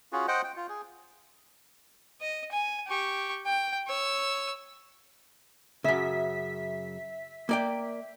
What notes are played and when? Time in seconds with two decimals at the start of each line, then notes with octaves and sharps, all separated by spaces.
0.12 C#4 F4 F#4 G#4
0.28 C5 D#5 F#5 G5
0.44 G5
0.56 F4
0.69 G#4
2.21 D#5
2.52 G#5
2.87 G4 C#6
3.46 G5
3.87 C#5 E6
5.84 F#2 C#3 E5 B6
7.49 A#3 D5 G5